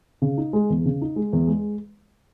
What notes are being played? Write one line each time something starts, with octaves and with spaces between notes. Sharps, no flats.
C#3
D#4
G#3
E2
C#3
D#4
G#3
E2
G#3